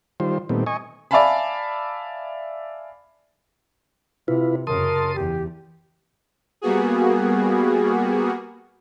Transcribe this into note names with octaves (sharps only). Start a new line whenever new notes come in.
D#3 G3 F4 C5
A#2 D#3 G3 A3 B3 C4
D#5 G#5 C#6
D5 E5 F5 G#5 A5 B5
C3 E4 F4 B4
F#2 C#3 A#4 A5 C6 D#6
E2 G4
G3 A#3 B3 F#4 G#4